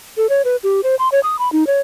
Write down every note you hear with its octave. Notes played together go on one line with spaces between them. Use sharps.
A4
C#5
B4
G4
C5
C6
C#5
D#6
B5
D#4
C#5